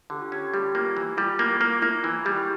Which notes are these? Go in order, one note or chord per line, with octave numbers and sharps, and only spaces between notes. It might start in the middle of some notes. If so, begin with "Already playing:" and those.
D3 G4
F4
C#4 G4
G3 G4
A#3 F4
E3 E4
G3 F4
A#3 F4
A#3
A#3 E4
E3
G3 G4